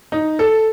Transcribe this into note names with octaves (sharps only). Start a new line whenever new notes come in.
D#4
A4